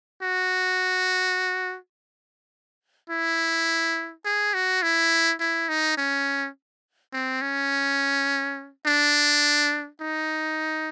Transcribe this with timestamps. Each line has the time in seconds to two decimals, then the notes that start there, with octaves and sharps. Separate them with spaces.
0.22 F#4
3.10 E4
4.25 G#4
4.54 F#4
4.83 E4
5.40 E4
5.69 D#4
5.97 C#4
7.13 C4
7.42 C#4
8.86 D4
10.01 D#4